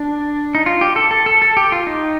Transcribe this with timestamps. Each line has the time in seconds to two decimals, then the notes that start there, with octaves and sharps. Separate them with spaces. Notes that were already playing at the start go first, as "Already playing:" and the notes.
Already playing: D4
0.55 D#4
0.66 F4
0.81 G4
0.96 A4
1.11 A4
1.26 A4
1.42 A4
1.57 G4
1.72 F4
1.87 D#4